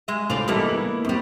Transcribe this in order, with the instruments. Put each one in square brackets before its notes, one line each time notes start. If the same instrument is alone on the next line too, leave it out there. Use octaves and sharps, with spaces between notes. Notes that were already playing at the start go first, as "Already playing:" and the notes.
[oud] G#3 E5
[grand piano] A2 [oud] F4 C5 D5
[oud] E3 A#3 B3 [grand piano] G3 G#3 A4
[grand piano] E4 F#7
[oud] F#2 G3 [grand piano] C4